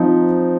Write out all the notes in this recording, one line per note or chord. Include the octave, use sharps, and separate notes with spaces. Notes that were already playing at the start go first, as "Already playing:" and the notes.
Already playing: F3 C4 D#4